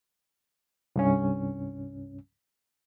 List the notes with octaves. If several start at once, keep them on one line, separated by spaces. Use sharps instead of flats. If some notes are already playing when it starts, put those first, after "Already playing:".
C2 G2 C#4